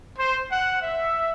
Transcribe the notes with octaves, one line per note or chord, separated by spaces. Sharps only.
C5
F#5
E5